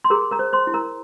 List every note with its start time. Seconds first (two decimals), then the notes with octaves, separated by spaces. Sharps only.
0.04 C6
0.10 G#4 A#4 A#5
0.31 A#4 A#5
0.39 C5
0.53 C5 C6
0.67 E4
0.74 A#4 A#5